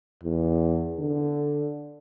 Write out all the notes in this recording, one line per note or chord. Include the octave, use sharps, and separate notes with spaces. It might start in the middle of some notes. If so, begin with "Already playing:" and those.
E2
D3